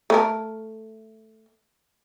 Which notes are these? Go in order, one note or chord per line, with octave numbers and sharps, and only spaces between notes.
A3 A#4